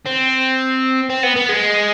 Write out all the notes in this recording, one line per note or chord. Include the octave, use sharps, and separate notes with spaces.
C4
C4
B3
B3
G#3